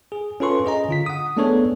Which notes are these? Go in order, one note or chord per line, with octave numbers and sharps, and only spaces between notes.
G#4
C#4 F4 A4 B4 C6 C#6
C#4 G#4 D#5 A#5
D3 F4 B6
F#5 D#6
A3 B3 D4 G#4 A4 C#5